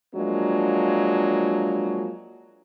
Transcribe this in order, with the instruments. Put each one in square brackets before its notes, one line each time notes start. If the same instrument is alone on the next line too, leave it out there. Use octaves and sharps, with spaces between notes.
[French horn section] F3 F#3 G#3 A#3 D4